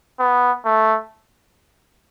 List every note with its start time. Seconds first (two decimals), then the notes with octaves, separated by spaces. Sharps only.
0.20 B3
0.65 A3